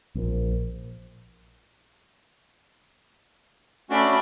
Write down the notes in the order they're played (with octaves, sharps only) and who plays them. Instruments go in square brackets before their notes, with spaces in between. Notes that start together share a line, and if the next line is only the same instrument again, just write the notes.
[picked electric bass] A#1
[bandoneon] A3 C#4 F#4 [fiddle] D4 B5